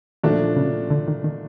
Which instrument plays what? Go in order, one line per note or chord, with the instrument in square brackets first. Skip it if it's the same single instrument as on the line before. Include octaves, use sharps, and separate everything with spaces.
[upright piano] A#2 F3 A3 D4 F#4 [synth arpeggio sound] D#3
[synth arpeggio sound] C#3
D3
D#3
D#3